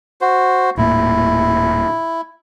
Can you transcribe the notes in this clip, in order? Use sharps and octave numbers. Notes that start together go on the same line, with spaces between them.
F#4 C5
D#1 A2 A#3 E4